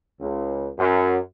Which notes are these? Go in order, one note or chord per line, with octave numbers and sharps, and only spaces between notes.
C#2
F#2